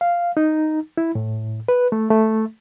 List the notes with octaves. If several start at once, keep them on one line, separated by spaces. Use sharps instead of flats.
F5
D#4
E4
A2
B4
A3
A3